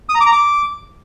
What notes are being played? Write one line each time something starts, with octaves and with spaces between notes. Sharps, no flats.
D#6
A#5
D6
A#5
D6